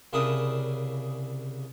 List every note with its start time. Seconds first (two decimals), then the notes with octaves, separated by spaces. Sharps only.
0.13 C2 C#3 D4 E4 A#4 D#6